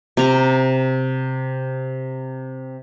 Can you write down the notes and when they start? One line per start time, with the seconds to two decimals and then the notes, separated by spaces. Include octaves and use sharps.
0.17 C3 A#5